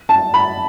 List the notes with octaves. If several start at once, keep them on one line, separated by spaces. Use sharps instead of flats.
A5
B5